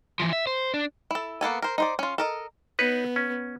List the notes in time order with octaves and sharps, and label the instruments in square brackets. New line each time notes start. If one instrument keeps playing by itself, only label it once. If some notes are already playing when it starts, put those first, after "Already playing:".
[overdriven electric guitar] E3 F3
E5
C5
D4
[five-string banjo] E4 A4
A#3 B3 A4 G#5
A#4 C5
D#4 C5 D5
C#4 F4
A4 A#4 D#5
[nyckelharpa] B3 [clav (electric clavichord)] D#4 B4 C#5
[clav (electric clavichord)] C#4